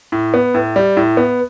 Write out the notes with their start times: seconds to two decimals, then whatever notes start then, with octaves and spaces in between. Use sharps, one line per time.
0.12 A2
0.34 B3
0.54 A2
0.76 G3
0.97 A2
1.17 B3